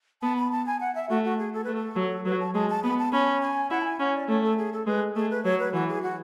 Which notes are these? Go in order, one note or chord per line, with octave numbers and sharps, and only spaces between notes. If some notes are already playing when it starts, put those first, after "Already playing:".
B3 A5
B5
A5
G#5
F#5
E5
A3 F#4
F#4
G#4
A4
A3 B4
A4
F#3
F#3 B4
A5
G#3 A5
A5
B3 B5
A5
C#4 B5
G#5
E4 F#5
A5
G#5
C#4 F#5
D5
A3 C#5
A4
G#4
A4
G#3 B4
A3 G#4
B4
F#3 C#5
B4
E3 F#4
G#4
F#4